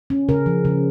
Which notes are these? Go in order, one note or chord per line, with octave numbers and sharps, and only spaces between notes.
C#4
C#3 A#4
F3
C#3